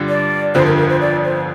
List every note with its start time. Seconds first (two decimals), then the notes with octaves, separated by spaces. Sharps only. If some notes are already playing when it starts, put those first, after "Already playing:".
Already playing: G2 D3 G3 D4 F4
0.09 D5
0.55 G1 F2 D3 F3 C5
0.66 A#4
0.77 A#4
0.89 C5
1.01 D5
1.24 C5